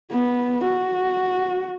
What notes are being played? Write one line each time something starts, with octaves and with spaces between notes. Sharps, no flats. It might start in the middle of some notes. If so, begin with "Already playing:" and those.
B3
F#4